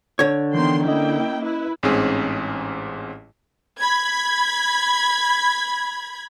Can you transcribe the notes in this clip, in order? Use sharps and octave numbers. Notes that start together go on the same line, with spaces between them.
D3 C#5
D#3 E3 B3 G5 C6
A#3 C#4 E4 D#5 G5
E4 B4
A1 G#2 C4 C#4 G#4
B5 G#6